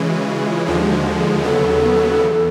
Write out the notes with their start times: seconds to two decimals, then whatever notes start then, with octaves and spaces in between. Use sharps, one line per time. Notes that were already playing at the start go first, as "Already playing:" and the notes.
Already playing: C#3 E3 G#3
0.08 F#4
0.28 F#4
0.47 F4
0.66 D#2 D3 F3 G#3 F4
0.81 G4
0.92 F#4
1.17 G#4
1.43 D#2 C#3 F#3 B3 A4
2.20 E2